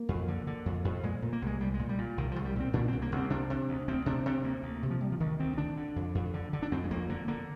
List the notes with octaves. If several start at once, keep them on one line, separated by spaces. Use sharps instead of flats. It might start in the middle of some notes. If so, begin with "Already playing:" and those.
Already playing: A#3
F2
D3
D3
F2
F2
A#2 G#3
A#2
A#3
C2 G#3
C2 G3
G#3
A#2
G3
A#2
C2 D#3
C2 F3
G3
A#2 C4
A#2 D4
C2 C4
A#3
C2 C4
C3 D4
C3
D2
D2 C4
C3 D4
C3 C4
D2 A#3
D2
C3
F3
C3 G3
F3
D2 D#3
D2 C4
D3 D4
D3
F2
F2
D3
D3
D4
F2 C4
G#3
F2 A#3
D3 A#3
D3 A#3